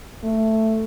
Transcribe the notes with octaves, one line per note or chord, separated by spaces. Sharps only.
A3